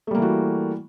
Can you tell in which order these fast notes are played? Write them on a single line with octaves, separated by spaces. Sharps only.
A3 G3 A#3 E3 F#4